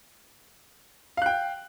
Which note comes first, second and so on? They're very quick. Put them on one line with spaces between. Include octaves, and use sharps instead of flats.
F5 F#6 G5